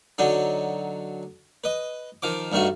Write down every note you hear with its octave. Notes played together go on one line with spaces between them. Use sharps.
D3 F#3 D4 D#4
B4 D#5
D#3 F3 D6
G2 D#3 A3 F#4